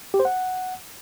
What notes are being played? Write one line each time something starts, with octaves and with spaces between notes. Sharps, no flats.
G4
C5
F#5